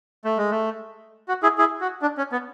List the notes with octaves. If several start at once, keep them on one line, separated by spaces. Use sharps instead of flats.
A3
G#3
A3
F#4
E4 G#4
E4 G#4
F#4
D4
C#4
B3